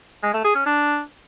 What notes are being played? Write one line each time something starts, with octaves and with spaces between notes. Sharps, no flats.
G#3
A3
G#4
C#4
D4